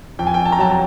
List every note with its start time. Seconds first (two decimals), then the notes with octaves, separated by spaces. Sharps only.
0.19 F2 G5
0.27 G#5
0.34 G5
0.46 A5
0.52 A#5
0.58 F#3 A5
0.71 A5